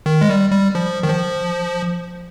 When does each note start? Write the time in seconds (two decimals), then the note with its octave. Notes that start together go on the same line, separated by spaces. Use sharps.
0.06 D#3
0.21 G#3
0.29 G3
0.52 G3
0.75 F3
1.03 D#3
1.10 F3